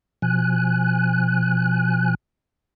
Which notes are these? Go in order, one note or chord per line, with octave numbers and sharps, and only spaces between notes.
B2 F3 G#5 F#6